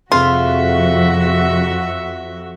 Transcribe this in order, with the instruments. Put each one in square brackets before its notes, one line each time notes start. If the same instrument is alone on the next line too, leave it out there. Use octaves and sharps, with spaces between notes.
[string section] F2 [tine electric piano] C3 C4 G#4 [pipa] F4 [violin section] F#4 E5